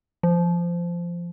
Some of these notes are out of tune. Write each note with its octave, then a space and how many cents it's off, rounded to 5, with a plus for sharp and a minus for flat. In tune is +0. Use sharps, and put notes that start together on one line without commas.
F3 -15